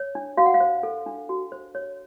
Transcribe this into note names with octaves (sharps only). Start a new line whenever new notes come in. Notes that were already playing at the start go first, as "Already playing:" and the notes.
Already playing: C#5
D4
F#4 F5
F#5
F5
C5
A4
D4
F#4
C5
C#5